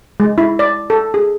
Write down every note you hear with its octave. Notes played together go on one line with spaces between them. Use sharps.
G#3
E4
D5
A4
G#4